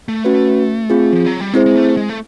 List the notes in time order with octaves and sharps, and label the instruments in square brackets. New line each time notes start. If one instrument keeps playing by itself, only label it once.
[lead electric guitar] A3
[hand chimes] C#4 F#4 B4
C4 F4 G#4
[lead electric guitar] F3
F#3
G3
[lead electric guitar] G#3 [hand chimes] C4 E4 G#4 C5
[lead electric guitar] G#3
A3
G#3
A3